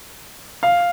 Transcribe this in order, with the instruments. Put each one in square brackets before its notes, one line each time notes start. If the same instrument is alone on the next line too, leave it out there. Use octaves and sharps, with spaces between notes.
[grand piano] F5